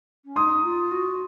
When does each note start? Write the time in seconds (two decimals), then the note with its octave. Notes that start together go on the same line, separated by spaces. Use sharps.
0.25 C#4
0.36 D#4 C6 D#6
0.64 F4
0.91 F#4